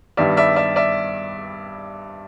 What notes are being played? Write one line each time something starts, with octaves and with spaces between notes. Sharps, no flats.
G2 D#3 G3 B3 D5 E5
D5 E5
D5 E5
D5 E5